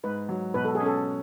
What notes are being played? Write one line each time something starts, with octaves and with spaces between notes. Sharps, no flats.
G#2 B4
F#3
B2 B4
A4
G#4
C#4
A4